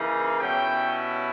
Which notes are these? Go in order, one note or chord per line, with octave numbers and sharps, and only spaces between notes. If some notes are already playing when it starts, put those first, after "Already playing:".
Already playing: C#3 E3 A#3 D#4
B2 G3 C#4 E4 G5